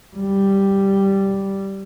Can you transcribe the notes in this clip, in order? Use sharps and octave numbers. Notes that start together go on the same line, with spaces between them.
G3